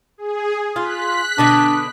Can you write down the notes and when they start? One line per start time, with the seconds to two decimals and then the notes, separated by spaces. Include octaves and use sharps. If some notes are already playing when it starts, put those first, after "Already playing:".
0.18 G#4
0.76 F4 F#6 B6
1.38 B2 D3 D4 D#5